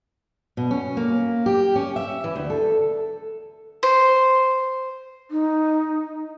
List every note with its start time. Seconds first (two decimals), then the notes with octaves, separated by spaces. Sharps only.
0.57 B2
0.71 C#4
0.97 A#3
1.46 G4
1.76 C#4
1.96 E5
2.24 E3
2.36 D2
2.50 A4
3.83 C5
5.31 D#4